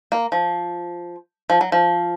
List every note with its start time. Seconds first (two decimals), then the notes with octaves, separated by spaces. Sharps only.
0.12 A#3
0.32 F3
1.50 F3
1.61 F#3
1.72 F3